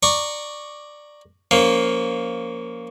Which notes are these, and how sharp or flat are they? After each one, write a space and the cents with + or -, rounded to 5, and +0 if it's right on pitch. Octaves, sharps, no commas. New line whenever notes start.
D5 +10 A#5 +0 C#6 +0
F3 +0 A#3 +0 C#4 +20